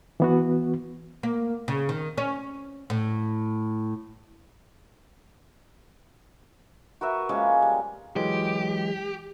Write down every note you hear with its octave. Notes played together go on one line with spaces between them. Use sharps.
E3 B3 F#4
A#3
C#3
D#3
C#4
A2
F#4 A#4 B4 E5
F3 G#3 A#3 C#4
G3
E3 F#3 G#3 G4